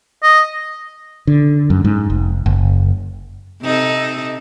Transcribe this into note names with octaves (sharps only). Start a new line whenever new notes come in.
D#5
D3
F#2
G#2
F1
F#1
C3 D#4 A4